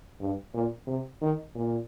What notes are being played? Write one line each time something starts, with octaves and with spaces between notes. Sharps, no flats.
G2
A#2
C3
D#3
A#2